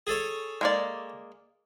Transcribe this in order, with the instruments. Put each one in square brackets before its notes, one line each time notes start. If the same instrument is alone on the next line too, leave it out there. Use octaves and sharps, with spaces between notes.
[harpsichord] G#4 A4 C#5
[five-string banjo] G#3 A#3 D5